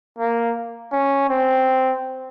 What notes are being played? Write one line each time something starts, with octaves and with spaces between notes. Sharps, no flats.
A#3
C#4
C4